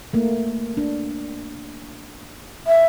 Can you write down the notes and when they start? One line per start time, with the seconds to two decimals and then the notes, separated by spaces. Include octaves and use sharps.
0.13 A3 A#3
0.77 D4
2.67 E5